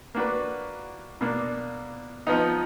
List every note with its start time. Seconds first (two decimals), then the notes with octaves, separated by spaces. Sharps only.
0.15 A#3 D4 F#4 B4
1.21 B2 A#3 D4
2.27 F3 B3 D#4